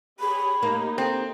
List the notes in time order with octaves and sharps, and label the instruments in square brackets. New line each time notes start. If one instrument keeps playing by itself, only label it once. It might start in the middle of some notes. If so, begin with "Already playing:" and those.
[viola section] G4 G#4 C#5 [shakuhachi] B5
[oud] A#3 [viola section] D#4 G4
[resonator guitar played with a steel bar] C4 [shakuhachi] A4